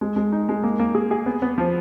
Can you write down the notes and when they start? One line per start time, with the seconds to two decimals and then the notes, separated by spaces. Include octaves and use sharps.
0.01 G#3
0.16 G#3
0.32 D#4
0.49 G#3
0.63 A#3
0.79 A#3
0.95 G#4
1.11 G#4
1.26 B3
1.42 B3
1.58 F3